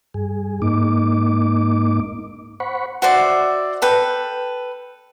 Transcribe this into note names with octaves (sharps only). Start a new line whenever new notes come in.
G2 G#4
G#2 A#3 D#4 D6
C5 F#5 B5 C#6
F#4 C5 D5 E5
A4 B4 G5